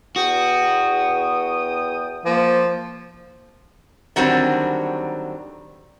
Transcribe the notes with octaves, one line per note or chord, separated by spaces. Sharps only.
E2 F#4 G5 D#6
F3 A#3
D3 D#3 F#3 G3 C4